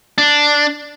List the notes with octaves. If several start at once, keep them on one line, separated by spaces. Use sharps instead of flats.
D4